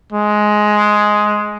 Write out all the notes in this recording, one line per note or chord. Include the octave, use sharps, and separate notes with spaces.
G#3